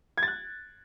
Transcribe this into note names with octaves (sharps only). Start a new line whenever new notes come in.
G#6
A6
F#6